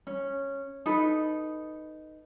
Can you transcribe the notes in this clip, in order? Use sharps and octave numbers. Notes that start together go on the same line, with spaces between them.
C#4
D#4 A4 B4